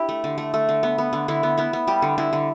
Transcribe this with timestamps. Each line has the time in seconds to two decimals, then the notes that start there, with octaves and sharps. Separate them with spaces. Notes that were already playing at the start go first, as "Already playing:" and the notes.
Already playing: D4 E4 G4
0.09 A3
0.24 D3
0.38 A3
0.54 A3
0.69 D3
0.83 B3
0.98 B3
1.13 D3
1.28 D3 E4
1.43 B3
1.57 B3 E4
1.73 B3
1.87 G3 G4
2.02 D3
2.18 D3 E4
2.33 D3